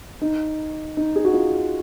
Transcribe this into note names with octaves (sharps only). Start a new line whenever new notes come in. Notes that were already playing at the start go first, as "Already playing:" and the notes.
D#4
D#4
G#4
F#4
F4